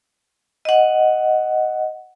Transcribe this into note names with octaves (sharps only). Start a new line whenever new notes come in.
D#5 F#5